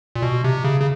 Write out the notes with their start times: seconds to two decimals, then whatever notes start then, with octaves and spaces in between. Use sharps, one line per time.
0.16 A#2
0.22 B2
0.44 C3
0.64 C#3
0.80 C#3